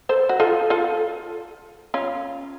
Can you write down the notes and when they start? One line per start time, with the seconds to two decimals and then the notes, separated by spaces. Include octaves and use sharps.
0.09 A4 C5
0.29 F#4
0.40 F4 A4
0.70 F4 A4
1.94 C#4 F4